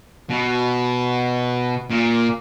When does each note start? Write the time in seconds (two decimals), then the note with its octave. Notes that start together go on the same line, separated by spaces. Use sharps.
0.30 B2
1.90 A#2